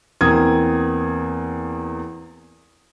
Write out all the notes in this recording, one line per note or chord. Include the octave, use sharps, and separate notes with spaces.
E2 A#3 C4 D#6 G#6